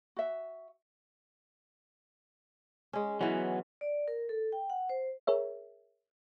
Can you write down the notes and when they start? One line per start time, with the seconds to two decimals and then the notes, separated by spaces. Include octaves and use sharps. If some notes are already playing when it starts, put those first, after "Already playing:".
0.17 F#4 E5
2.93 G#3 C#4
3.21 E3 F#3 B3 C#4
3.81 D5
4.08 A#4
4.29 A4
4.52 G5
4.70 F#5
4.89 C5
5.27 G#4 A#4 C#5 E5